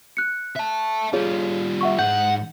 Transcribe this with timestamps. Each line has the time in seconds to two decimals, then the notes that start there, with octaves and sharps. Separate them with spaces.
0.17 F#6 C#7
0.56 E5 A5
1.13 G3 F4 G#4 C#5
1.81 E5 F#5 C#6
1.99 G#2 F#5 G6